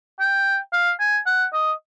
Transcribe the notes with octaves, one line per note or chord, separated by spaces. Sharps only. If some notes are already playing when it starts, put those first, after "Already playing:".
G5
F5
G#5
F#5
D#5